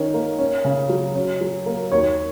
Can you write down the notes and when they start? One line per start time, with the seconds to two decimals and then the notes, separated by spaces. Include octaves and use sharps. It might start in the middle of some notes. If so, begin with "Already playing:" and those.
Already playing: D#3 C#4
0.14 A#3
0.39 C#4
0.65 C#3
0.89 F#3
1.15 C#4
1.41 F#3
1.66 A#3
1.92 D#2 C#5